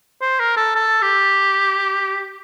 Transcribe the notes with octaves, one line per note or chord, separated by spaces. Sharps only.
C5
A#4
A4
A4
G4